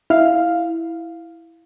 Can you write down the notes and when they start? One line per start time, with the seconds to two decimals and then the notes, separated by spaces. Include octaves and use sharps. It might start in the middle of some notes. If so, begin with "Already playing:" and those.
0.10 E4 F5